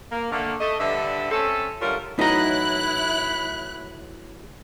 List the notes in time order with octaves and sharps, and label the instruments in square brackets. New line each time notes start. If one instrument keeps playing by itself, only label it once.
[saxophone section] A#3
D3 A3 A#3
A3 D#5
G2 D3 G3 D5 E5
A3 C4 C#4 A4
D3 G3 A3 C#4 F4 A#4
[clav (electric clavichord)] A2 E3 F#3 [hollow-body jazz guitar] D#4 A#5 [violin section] E4 F#6 [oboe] B5